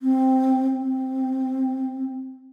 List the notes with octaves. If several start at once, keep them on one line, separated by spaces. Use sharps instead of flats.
C4
C4